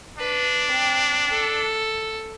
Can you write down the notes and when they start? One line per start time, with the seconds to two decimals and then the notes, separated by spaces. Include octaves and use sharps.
0.18 D4 B4
0.67 C4 G5
1.30 A4